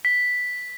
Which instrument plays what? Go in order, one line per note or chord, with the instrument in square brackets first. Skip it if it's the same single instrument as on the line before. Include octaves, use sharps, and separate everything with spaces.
[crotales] B6